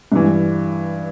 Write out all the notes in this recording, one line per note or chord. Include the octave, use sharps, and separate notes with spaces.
G2 E3